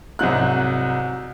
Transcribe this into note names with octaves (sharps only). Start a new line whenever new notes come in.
C2 G#2 F#3 F#6